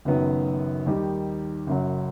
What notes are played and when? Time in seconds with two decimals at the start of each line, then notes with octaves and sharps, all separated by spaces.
0.05 F#1 F#2 D#3 F#3 B3
0.86 D#2 D#3 G3 D#4 G4
1.67 F#1 F#2 F#3